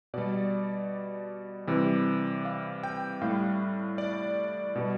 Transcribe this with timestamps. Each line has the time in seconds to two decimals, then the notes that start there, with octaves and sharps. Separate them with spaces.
0.14 B2 G3 D5
1.67 C3 E3 G3
2.45 F5
2.84 G5
3.22 A2 G3 F5
3.98 D5
4.75 B2 G3